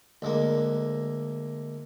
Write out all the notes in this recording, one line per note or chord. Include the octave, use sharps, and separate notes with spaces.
D2 G#3 A#3